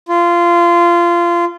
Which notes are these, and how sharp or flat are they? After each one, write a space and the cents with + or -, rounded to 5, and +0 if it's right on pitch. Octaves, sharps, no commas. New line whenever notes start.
F4 -20